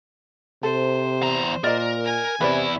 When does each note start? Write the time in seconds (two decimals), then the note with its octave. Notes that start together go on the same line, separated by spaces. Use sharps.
0.63 C3 A4 C5
1.22 E2 A#5
1.64 A#2 A#4 D5 D#5
2.04 G#5
2.41 E2 C3 E4 B4 D5